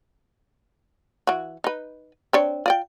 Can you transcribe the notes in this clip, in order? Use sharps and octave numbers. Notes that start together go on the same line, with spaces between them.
E3 F#4
D#4 B4
C4 D4 C#5
F4 D5 G5